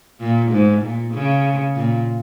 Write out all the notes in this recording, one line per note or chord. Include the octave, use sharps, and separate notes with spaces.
A#2
G#2
A#2
C#3
A#2